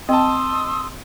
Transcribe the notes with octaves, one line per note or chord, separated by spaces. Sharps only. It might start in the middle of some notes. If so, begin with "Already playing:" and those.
C4 D#5 A5 C6 D#6 E6